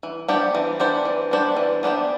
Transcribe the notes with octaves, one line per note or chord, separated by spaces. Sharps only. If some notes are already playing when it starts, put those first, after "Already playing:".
E3
B3 D4 G4 C5
E3
B3 D4 G4 C5
E3
B3 D4 G4 C5
E3
B3 D4 G4 C5